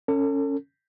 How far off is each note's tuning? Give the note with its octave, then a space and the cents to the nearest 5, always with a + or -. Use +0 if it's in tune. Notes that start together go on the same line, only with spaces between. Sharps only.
C#4 +0 A4 +35